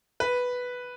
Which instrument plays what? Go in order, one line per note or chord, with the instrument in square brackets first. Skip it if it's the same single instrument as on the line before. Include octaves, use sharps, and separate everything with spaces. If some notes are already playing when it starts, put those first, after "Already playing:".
[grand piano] B4